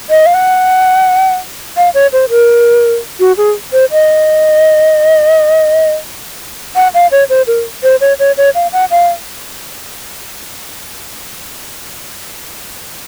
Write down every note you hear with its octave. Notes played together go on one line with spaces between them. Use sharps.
D#5
F5
F#5
F5
C#5
C5
A#4
F#4
G#4
C5
D#5
F#5
F5
C#5
C5
A#4
C5
C#5
C#5
C#5
F5
F#5
F5